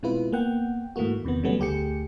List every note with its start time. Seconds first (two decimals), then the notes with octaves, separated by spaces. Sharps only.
0.03 B2 G#3 C4 E4 F4 B4
0.32 A#3 B3 F#5 G5
0.96 G#2 E3 A3 A#3 F#4
1.25 E2 C3 D#3 B3
1.43 C#3 F#3 G3 A3 B3 C#4
1.59 D2 A3 G4 G#4 G5 C#7